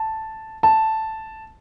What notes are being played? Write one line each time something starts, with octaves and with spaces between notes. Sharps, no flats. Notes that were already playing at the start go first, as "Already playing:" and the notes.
Already playing: A5
A5